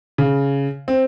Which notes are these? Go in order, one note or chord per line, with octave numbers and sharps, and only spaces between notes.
C#3
C4